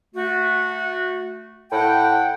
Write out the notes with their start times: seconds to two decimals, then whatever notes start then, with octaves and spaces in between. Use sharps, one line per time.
0.15 A3 F#4
1.72 A2 F#5 G5